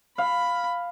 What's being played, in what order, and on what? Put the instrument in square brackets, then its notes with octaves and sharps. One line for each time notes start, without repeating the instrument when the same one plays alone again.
[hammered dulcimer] F5 [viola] B5